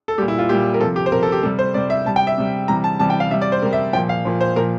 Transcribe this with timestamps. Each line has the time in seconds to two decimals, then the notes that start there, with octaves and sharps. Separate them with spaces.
0.08 A4
0.18 A#2 G3 G4
0.28 E4
0.39 F4
0.49 A#2 G3 G4
0.74 A#4
0.80 F3 A4
0.84 C3
0.96 G4
1.06 C5
1.12 C3 F3 A#4
1.23 A4
1.32 G4
1.43 C3 G3 A4
1.59 C5
1.74 C3 G3 D5
1.90 E5
2.05 C3 G3 A5
2.16 G5
2.27 E5
2.37 C3 G3
2.68 C3 E3 G3 A#5
2.84 A5
2.99 C3 E3 G3 A5
3.10 G5
3.20 F5
3.31 C3 E5
3.34 G3
3.42 D5
3.52 C5
3.62 C3 A#4
3.65 G3
3.73 E5
3.93 F3 G5
3.97 A#2
4.09 F5
4.25 A#2 F3
4.41 C5
4.56 A#2 F3 A#4